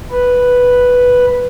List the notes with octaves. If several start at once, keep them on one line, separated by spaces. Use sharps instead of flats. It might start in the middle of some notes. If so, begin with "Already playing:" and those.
B4